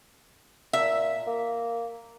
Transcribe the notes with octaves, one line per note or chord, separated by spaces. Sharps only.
A#2 E5
A#3